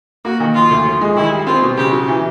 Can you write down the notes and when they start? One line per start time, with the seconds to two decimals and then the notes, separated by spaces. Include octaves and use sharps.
0.25 A#3 F#4
0.40 D#3
0.55 F3 F4
0.70 D2
0.86 F3
1.01 G#3
1.16 D#3 E4
1.32 G3
1.47 C4 F4
1.62 B2
1.77 C#3 G4
1.93 F#3
2.08 E3